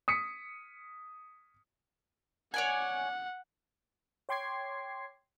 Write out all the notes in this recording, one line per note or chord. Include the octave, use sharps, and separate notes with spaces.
D#6 B6 C#7
C#5 D5 F#5 G#5
C#5 G5 C6 D6 G#6 C7